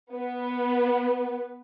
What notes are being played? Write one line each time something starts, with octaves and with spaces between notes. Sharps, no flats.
B3 B4